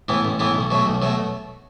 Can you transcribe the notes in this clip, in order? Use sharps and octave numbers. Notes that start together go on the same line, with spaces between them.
A2 E3 B3
A1
A2 E3 B3
B1
B2 F#3 A3
B1
B2 F#3 A3